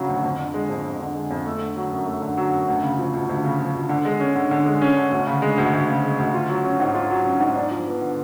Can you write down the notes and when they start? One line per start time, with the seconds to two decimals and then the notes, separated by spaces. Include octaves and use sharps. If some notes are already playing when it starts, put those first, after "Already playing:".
Already playing: C#3 F#3
0.09 D2
0.23 F2
0.39 D3
0.54 G#3
0.70 F2
0.85 F2
1.00 D3
1.15 G#3
1.31 F2
1.46 A3
1.61 D3
1.76 F#3
1.91 F#2
2.07 A3
2.22 D3
2.37 F#3
2.53 F#2
2.68 D2
2.83 C#3
2.98 F3
3.14 D2
3.29 D2
3.44 C#3
3.59 F3
3.75 D2
3.89 D3
4.05 G#3
4.20 C#4
4.36 D3
4.51 D3
4.66 G#3
4.82 C#4
4.97 D3
5.12 D2
5.27 C#3
5.42 G#3
5.58 D2
5.73 D2
5.88 C#3
6.03 G#3
6.19 D2
6.34 F4
6.49 F#3
6.64 C#4
6.80 G#2
6.95 F4
7.10 F#3
7.26 C#4
7.40 G#2
7.56 D4
7.71 F3
7.87 B3
8.02 D3